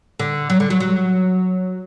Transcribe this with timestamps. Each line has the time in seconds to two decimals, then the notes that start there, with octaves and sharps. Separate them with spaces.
0.19 D3
0.50 F#3
0.60 D3
0.70 F#3
0.80 F#3